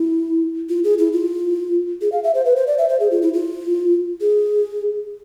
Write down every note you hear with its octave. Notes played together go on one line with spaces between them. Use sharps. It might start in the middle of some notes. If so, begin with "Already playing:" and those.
Already playing: E4
F4
G#4
E4
F4
G#4
F5
E5
C5
B4
C5
D5
E5
C5
G#4
F4
E4
F4
G#4